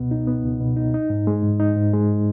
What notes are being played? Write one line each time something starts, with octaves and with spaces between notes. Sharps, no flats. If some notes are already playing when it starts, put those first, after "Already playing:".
Already playing: C#2 B2 B3
D#4
B3
C#2
B2
D#4
D#4
G#2
G#3
G#2
D#4
G#2
G#3